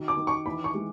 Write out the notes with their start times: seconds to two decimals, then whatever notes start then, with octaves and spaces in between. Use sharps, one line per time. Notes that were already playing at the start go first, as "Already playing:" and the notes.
Already playing: D#3 F#4
0.08 D6
0.17 D#3
0.27 C#6
0.46 E3 B5
0.64 C#6
0.74 G#3